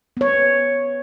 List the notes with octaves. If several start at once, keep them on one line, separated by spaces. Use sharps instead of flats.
B3 C#5